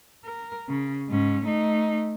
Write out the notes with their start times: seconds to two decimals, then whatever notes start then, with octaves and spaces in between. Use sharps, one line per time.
0.25 A#4
0.69 C#3
1.09 G#2 C#4
1.44 A3 D#4